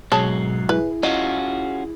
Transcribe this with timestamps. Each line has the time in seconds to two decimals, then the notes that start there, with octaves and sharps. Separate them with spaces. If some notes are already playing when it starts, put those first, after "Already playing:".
0.12 G#2 B2 F#3 G#4 C#5 A5 C7
0.69 E4 G#4 B4
1.03 C#4 F4 F#4 D#5